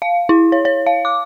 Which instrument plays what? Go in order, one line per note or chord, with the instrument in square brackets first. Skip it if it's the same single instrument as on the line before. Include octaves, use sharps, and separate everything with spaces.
[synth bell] F5
E4
C#5
C#5
F5
D6